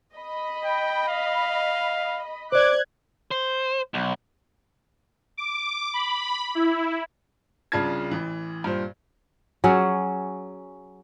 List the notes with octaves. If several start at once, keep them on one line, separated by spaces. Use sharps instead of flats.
D#5 B5
G5
F5
C5 D5 D6 F#6 G#6
C5
B1
D6
B5
E4
C2 C#3 D4 F4 A5 G#6
A1 E3
G2 A#2 C5
F#3 C#4 G#4 F#5